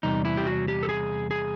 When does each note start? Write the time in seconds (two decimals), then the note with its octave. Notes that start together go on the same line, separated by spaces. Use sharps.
0.03 E2 C3 G3 D#4
0.25 E4
0.37 G4
0.46 F#4
0.68 G4
0.83 A4
0.89 G#4
1.31 G#4